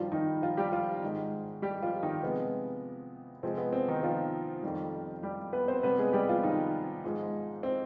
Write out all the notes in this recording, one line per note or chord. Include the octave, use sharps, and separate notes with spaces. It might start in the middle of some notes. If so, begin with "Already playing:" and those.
Already playing: G2 D#3 F3 G3 F4
D#3 D#4
F3 F4
G3 G4
F3 F4
G#2 D#3 G#3
G3 G4
F3 F4
D#3 D#4
C3 F3 G#3 B3
C3 F3 G#3 C4
B3
C4
D#3 D#4
F3 F4
F2 D#3 G3
G3 G4
B3 B4
C4 C5
C3 G3 B3 B4
G#3 G#4
G3 G4
F3 F4
D#3 D#4
G#2 F3 G#3
C4